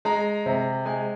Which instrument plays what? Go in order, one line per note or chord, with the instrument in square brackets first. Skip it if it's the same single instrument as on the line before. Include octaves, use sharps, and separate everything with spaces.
[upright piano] G#3 A#5
C3
G#3 G#5